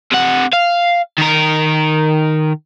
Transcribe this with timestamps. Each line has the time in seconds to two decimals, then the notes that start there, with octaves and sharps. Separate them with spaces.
0.12 C3 F#5
0.53 F5
1.18 D#3 A#4